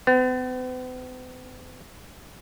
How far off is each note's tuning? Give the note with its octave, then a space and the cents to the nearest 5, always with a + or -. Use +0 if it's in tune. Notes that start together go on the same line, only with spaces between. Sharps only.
B3 +45